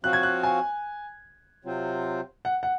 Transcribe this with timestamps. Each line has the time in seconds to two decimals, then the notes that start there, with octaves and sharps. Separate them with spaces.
0.03 F3 C4 F#4 C#5 F5 F#6
0.13 G#6
0.23 F#6
0.43 G#5
1.65 C3 F#3 C4 F4 C5
2.45 F#5
2.63 F#5